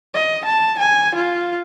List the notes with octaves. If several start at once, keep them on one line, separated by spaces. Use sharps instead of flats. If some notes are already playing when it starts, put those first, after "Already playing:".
D#5
A5
G#5
F4